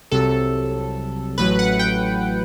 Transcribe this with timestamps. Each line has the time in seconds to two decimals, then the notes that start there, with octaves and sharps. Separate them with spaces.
0.11 C2 C3 F#3 A4
1.38 A1 A2 F#3 B4
1.59 F#5
1.79 G5